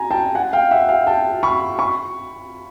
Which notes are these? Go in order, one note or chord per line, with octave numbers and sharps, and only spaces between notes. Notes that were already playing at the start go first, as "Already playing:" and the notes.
Already playing: G#5 A#5
G5 A5
F#5 G#5
F5 G5
E5 F#5
F5 G5
G5 A5
B5 C#6
B5 C#6